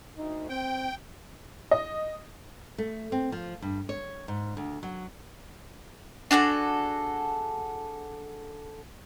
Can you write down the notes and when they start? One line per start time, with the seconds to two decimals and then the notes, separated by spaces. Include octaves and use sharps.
0.17 D2 D#4
0.49 C4 G5
1.71 D#5
2.78 A3
3.12 C4
3.32 F3
3.62 G2
3.89 C#5
4.28 G#2
4.57 D2
4.83 F#3
6.31 D4 F#4 G#4 A4